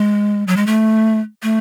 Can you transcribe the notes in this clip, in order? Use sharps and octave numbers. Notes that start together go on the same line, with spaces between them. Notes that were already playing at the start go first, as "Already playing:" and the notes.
Already playing: G#3
F#3
G#3
A3
A3